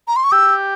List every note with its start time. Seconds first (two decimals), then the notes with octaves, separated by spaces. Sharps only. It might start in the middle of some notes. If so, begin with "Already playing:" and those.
0.08 A#5
0.16 C6
0.24 C#6
0.32 G4 E6